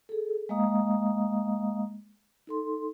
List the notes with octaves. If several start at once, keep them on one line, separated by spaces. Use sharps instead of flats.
G#4 A4
G#3 A#3 D#5 F5 A#5 D#6
D#4 A4 C6